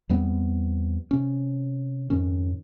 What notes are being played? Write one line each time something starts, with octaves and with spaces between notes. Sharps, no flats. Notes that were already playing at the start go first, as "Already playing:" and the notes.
E2 G3 B3 C4
C3 C#4
F2 G#2 D#3 C#4